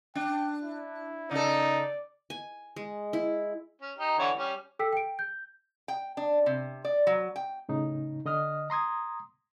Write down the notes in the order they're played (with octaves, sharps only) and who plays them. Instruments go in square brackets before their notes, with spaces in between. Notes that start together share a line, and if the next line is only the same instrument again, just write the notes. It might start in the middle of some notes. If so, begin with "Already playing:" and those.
[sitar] D4 [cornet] G5
[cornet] E4
[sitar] C#3 A4 [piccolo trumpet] D#4 [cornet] D5
[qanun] G#5
G#3
E4
[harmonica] C#4
D#4 G4
D3 E3 C#5
G3 C#4
[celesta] A4 G5 E6 B6
G5 D7
G6
[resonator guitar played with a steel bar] G5
D4
C3
D5
F#3
G5
[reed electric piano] A2 C#3 D#4
D3 D#5 D#6 F6
A#5 C6 D#6 G#6